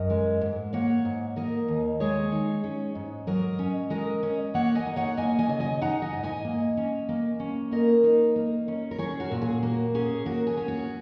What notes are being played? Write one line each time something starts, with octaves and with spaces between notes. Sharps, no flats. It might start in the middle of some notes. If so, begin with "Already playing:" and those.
Already playing: F#2 A#4 D#5
G#3
G#2
A#3 C#5 F#5
G#2
A#3 A#4 D#5
D#2
G#3 G#4 C#5
D#4
C#4
G#2
F#3 A#4 D#5
C#4
G#3 A#4 D#5
C#4
A#3 C#5 F#5
D#5 G#5
D#4
C#5 F#5
A#3 D#5 G#5
D#5 G#5
C#3
D#5 G#5
D#4 F#5 A#5
D#5 G#5
G#2
D#5 G#5
A#3
C#4
A#3
C#4
A#3 A#4 D#5
D#4
A#3
C#4
A#4
C#4 G#4 C#5
F#4 A#4
A#2
G#4
A#3 F#4
C#4 G#4
A#3 F#4 A#4
G#4
C#4
F#4